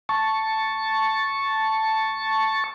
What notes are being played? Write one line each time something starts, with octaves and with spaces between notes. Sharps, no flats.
A5 C#6